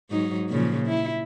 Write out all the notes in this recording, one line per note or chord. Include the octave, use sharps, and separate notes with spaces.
G#2 F#3 D#4
A#2 C#3 F3
E4